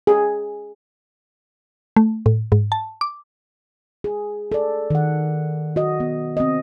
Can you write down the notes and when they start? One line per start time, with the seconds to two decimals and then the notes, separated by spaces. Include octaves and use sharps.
0.07 G#4
1.96 A3
2.26 A2
2.52 G#2
2.72 A5
3.01 D6
4.04 G#4
4.52 A4 D5
4.90 D#3 F#5
5.76 F#4 D#5
6.00 B3
6.37 C4 D#5